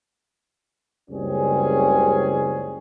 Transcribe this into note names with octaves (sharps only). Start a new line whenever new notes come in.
F#1 C#2 G3 C4 C#4 G#4